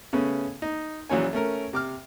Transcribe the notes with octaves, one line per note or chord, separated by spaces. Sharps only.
C#3 A3 B3 C#4
D#4
A#1 E3 F#3 C#4 C#5 G#5
A3 C#4 A#4
C3 D6 F6